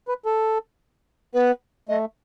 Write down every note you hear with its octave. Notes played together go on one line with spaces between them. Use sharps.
B4
A4
B3 B4
A3 D#5